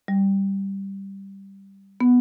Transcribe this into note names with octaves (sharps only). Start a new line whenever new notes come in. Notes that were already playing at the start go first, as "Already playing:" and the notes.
G3
B3